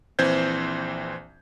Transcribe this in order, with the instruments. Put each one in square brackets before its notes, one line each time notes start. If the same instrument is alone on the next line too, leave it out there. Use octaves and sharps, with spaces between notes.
[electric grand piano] A#1 E3 C4 C5 G6 G#6